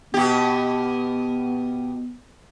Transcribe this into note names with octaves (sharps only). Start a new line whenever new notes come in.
B2 B3 G4